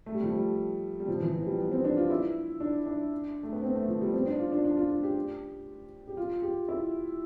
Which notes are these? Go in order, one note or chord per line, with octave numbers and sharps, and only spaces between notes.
A3
G3
F3
G3
G3
F3
E3
F3
G3
B3
C4
D4
F4
E4
D4
D4
A3
B3
C4
A3
F3
G3
C4
D4
F4
D4
D4
F4
F4
G4
G4
F4
G4
E4